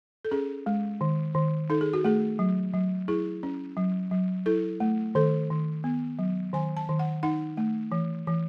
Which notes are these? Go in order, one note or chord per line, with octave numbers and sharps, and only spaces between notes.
A4
C#4 G#4
G#3
D#3
D#3
D#4 A4
G#4
F#4
A3 G#4
F#3
F#3
E4 G#4
C#4
F#3
F#3
E4 A4
A3
D#3 A4
D#3
B3
F#3
D#3 G#5
A5
D#3
F#5
D#4 F#5
A3
E3
E3